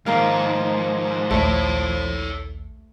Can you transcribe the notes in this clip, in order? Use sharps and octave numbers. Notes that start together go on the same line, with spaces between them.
G#2 D#3 F3 A#3 F5
A#1 D#2 A3 A4 C#5